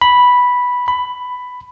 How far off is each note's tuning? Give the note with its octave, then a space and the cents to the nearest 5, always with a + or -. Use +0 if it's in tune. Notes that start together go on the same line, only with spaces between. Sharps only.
B5 -5
B5 +10